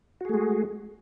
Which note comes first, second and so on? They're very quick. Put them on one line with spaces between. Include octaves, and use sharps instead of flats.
F#4 G#4 A3 G#3